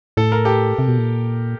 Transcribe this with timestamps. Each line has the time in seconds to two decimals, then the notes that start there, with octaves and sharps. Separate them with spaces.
0.17 A2 A4
0.32 A#4
0.45 G4 A4
0.79 C3
0.88 B2
0.98 A#2